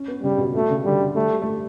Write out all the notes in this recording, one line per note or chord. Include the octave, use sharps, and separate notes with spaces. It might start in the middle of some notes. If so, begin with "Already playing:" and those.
Already playing: C#4
B3
C#3 G3
B2
B2 A3
C#3
D3 G3
D3
G3 A3
G3
A3
G3